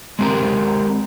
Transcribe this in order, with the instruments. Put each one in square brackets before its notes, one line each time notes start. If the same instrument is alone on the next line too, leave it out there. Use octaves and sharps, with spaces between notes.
[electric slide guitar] G#3 C4 G4 A#4